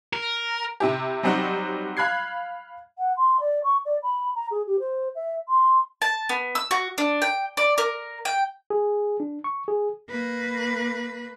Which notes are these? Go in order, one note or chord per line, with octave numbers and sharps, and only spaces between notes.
A#4
C3 E4 G4
F#3 G3 C4 D#4 F#4
F5 B5 F#6 G#6 C7
F#5
C6
D5
C#6
D5
B5
A#5
G#4
G4
C5
E5
C6
A5
B3
E6
F#4
D4
G5
D5
A#4
G5
G#4
D4
C#6
G#4
A#3 B4